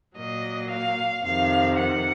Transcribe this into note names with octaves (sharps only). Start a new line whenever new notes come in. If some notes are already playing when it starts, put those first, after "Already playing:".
A#2 F#3 A#3 D#5
F5
F2 C3 D#3 F5
F#5